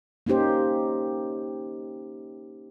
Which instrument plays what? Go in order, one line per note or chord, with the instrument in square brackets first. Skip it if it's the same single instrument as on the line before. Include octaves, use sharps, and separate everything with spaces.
[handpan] A#3 C#4 D#4 G4 C5